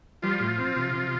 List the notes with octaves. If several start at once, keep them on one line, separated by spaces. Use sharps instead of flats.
F3 G3 F4
A2
C4
C3
C3